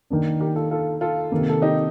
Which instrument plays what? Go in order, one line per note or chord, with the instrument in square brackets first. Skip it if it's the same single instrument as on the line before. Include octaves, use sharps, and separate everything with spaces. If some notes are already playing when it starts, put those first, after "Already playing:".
[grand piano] D#3 A#3 D4
[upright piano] G4 A#4
F4 A4
F4 A4
F4 A4
[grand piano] C3 D#3 A#3
[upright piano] A4
D#4 G4